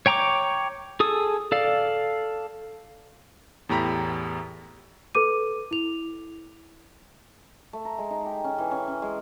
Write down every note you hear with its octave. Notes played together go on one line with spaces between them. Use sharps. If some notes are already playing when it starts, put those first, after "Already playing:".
C#5 G5 A#5 C#6 D6
G#4 A4 D#6
A4 D5 F5
E2 A2 G4 A#5 B5 B6
A4 B4 D6 D#7
E4 F7
A3
A#5
G#3
D#4
G4
C#4
E3
C#4
C#4
G#3